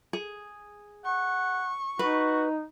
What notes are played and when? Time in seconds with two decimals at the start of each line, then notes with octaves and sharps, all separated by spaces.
0.13 G#4
1.05 F#5 C#6
1.99 D#4 F#4 B4